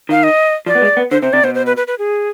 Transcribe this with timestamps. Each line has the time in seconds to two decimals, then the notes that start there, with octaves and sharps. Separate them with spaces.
0.09 D#3 F5
0.23 D#5
0.66 F3 D5
0.75 B3
0.82 G#3
0.97 B3
1.11 D3 C5
1.22 C3 C5
1.33 C3 D5
1.43 B2 C5
1.55 C5
1.66 B4
1.77 B4
1.87 B4
1.99 G#4